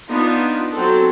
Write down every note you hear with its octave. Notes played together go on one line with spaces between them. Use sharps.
B3 D4 D#4 F4
F#3 C4 A4